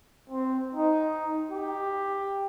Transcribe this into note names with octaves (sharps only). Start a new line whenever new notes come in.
C4
D#4
G4